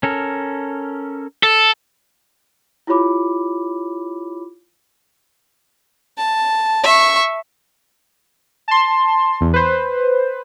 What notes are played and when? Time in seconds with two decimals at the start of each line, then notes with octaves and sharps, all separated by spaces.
0.03 C#4 A4 A#4
1.43 A4
2.87 E4 F4 G4 C#5 B5 D6
6.17 A5
6.83 E5 C#6
8.68 A5 C6
9.41 E2
9.54 B4 C5